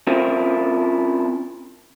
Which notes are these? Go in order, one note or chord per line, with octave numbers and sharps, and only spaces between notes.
C4 C#4 E4 F4 A#4